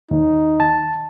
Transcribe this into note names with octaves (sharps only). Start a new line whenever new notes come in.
D#2 D#3 D#4
A5